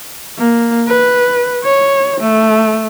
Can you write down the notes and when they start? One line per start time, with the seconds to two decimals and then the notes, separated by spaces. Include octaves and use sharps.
0.38 A#3
0.88 B4
1.64 C#5
2.21 A3